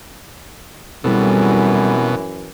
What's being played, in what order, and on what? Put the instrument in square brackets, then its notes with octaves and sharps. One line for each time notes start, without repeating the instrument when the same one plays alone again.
[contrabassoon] C2 [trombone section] F#2 E3 [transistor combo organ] B2 [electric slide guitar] G3 A4